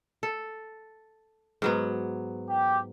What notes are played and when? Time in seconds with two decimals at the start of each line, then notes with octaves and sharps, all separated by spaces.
0.23 A4
1.62 G#2 F#3 B3
2.49 G4